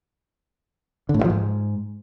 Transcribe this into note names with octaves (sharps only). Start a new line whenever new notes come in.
D3
A2
G2
F3
G#2